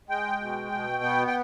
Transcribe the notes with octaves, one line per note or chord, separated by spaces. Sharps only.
G#3 G5
B2
B2
B3
G5